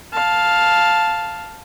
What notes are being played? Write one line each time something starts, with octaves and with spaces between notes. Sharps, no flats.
F5 A5